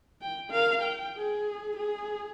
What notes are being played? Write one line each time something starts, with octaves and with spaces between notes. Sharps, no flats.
G5
A#4 F5
G5
G#4
G#4